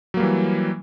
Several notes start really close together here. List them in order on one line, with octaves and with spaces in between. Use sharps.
F#3 A#3 G3 E3